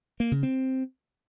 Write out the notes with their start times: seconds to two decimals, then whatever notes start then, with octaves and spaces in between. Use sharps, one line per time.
0.20 A#3
0.31 C#3
0.43 C4